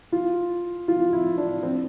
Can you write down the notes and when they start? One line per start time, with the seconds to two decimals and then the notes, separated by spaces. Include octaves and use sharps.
0.12 F4
0.88 F4
1.13 E4
1.38 D4
1.63 C4